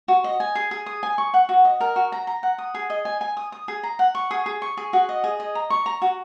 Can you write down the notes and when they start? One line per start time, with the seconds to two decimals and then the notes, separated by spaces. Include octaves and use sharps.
0.08 F#4
0.24 D#5
0.40 G#5
0.55 G#4
0.71 G#4
0.86 D#6
1.03 G#5
1.18 C#6
1.34 F#5
1.49 F#4
1.65 D#5
1.81 A#4
1.96 F#4
2.12 A#5
2.27 A#5
2.43 F#5
2.58 D#6
2.75 G#4
2.90 D#5
3.05 G#5
3.21 G#5
3.37 D#6
3.52 D#6
3.68 G#4
3.83 A#5
3.99 F#5
4.15 C#6
4.31 G#4
4.46 G#4
4.62 C#6
4.77 G#4
4.93 F#4
5.09 D#5
5.24 G#4
5.40 D#5
5.55 A#5
5.70 C#6
5.86 A#5
6.02 F#4